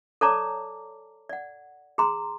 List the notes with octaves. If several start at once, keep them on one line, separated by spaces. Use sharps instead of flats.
A4 C#5 D5 A5 A#5 D6
D5 F#5
G#4 A#5 C6